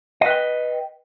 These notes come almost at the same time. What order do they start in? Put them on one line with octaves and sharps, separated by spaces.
D#5 B4 G5